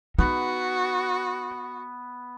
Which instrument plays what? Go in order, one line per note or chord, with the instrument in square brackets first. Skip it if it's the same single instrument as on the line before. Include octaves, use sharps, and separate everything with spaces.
[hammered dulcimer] B3 [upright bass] D#4 [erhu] F#4